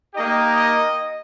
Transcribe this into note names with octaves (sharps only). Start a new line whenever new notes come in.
A#3 D#4 G4 D#5
D#5